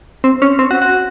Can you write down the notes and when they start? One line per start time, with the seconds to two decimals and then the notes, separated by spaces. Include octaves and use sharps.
0.24 C4
0.42 C#4
0.59 C4
0.71 F#4
0.82 F#4